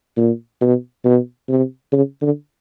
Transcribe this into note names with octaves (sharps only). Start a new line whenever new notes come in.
A#2
B2
B2
C3
C#3
D3